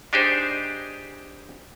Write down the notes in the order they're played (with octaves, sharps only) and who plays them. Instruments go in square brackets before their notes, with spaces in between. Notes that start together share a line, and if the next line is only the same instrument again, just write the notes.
[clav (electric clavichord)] D4 D#4 G4 G#4 C5